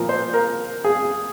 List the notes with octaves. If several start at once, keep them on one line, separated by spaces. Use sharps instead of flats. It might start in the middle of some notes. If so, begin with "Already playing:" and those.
Already playing: A#2 F3 A#4
C5
A#4
G#4